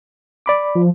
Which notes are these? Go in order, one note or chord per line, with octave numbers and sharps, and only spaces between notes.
D5 B5 D6
F3